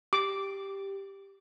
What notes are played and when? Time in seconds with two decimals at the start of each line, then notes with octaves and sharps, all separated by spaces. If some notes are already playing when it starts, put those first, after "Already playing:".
0.13 G4 D6